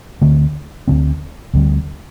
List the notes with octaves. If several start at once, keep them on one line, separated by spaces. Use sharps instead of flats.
D2 D3 A3 C4
D2 D3 A3 C4
D2 D3 G3 C4